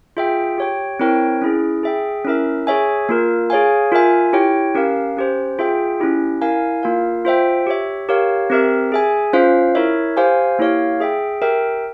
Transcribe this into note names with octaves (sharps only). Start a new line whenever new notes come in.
F4 G#4 E5 G5
G4 C#5 G5
C4 E4 A#4 C#5 G5
C#4 E4 G#4
G#4 E5 G5
C#4 E4 A#4 E5
G#4 C#5 E5 G#5
A#3 F4 A#4
G#4 C#5 F5 G#5
F4 A#4 E5 G#5
E4 G4 C#5 G5
C#4 G4 A#4 F5
C#4 G4 C5
F4 G#4 E5 G5
C#4 E4 G4
E4 A#4 F5 G#5
A#3 F4 A#4 F5
F4 C5 E5 G5
G4 C#5 E5
G4 A#4 C#5 F5
C4 G4 A#4 E5
G#4 E5 G#5
C#4 F4 C5 F5
E4 A#4 C#5 E5
G4 C5 F5 G#5
A#3 E4 G4 C#5 F5
G#4 E5 G5
G4 A#4 E5 G5